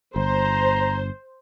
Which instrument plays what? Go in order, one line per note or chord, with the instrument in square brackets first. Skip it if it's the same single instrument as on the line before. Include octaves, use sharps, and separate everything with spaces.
[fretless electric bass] G1 [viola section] C5 [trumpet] A#5